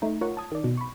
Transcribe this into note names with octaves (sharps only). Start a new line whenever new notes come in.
A3 D#4
F4 A#4 C#5 F#5 C#6
A5 D#6 G#6
D#3 D5
B2
B5 C#6